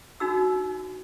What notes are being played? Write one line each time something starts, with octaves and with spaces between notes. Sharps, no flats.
D4 D#4 F#4 E6